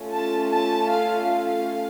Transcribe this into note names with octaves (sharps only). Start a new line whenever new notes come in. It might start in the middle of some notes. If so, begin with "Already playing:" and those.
Already playing: A3 C#4 F4 A4
A5
A5
F5
F5